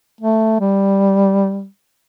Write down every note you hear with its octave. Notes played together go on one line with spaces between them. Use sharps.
A3
G3